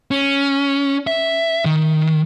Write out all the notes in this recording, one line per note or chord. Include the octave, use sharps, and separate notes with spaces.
C#4
E5
D#3